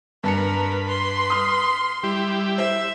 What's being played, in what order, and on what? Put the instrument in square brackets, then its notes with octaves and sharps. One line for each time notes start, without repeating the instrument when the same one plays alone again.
[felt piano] G2 A5 C#7 [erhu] A#4 [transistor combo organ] B4
[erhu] C6
[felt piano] D#6 F6
[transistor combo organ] G3 E4 G4
[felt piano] C5 [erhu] E5